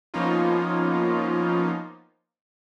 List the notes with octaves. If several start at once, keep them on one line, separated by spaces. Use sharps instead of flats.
F3 A#3 B3 C#4 D#4 F4